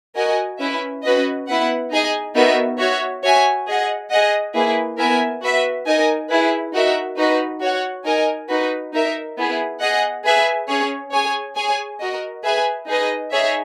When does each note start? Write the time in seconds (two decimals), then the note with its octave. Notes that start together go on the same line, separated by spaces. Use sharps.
0.15 F#4 A#4 D#5 G#5
0.59 C#4 E4 B4 E5
1.03 C#4 F#4 B4 D#5
1.47 B3 E4 B4 F#5
1.91 D#4 G#4 D#5 G#5
2.35 B3 D#4 F#4 A#4 E5
2.79 F#4 C#5 E5
3.23 F#4 C#5 E5 G#5
3.67 G#4 D#5 F#5
4.10 G#4 D#5 F#5
4.54 A#3 E4 G#4 B4
4.98 B3 E4 A#4 E5 G#5
5.42 F#4 B4 E5
5.86 D#4 A#4 D#5 G#5
6.30 E4 G#4 B4
6.73 D#4 F#4 A#4 E5
7.17 D#4 F#4 B4
7.61 F#4 C#5 F#5
8.05 D#4 A#4 D#5 G#5
8.49 D#4 F#4 B4
8.93 D#4 A#4 E5
9.36 B3 E4 G#4
9.80 G#4 D#5 F#5
10.24 G#4 B4 E5 G#5
10.68 C#4 G#4 C#5
11.12 G#4 C#5 G#5
11.56 G#4 C#5 G#5
12.00 F#4 A#4 D#5
12.43 G#4 B4 E5 G#5
12.87 D#4 G#4 B4 D#5
13.31 D#4 G#4 C#5 E5